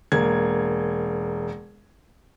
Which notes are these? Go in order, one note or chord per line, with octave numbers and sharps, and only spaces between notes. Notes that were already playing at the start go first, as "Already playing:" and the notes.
E1 A#3 G#6